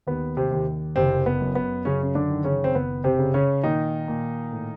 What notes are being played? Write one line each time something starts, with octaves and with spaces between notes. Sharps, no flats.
D#2 B3
C3 C4
D#2
F#1 C3 C4
B3
F#2
B3
F#2 C#3 C#4
C#4
D3 D4
D#3
C#3 C#4
C4
F#1 B3
C3 C4
C#3
C#3 C#4
A#2 D#3 D#4
A#2
A2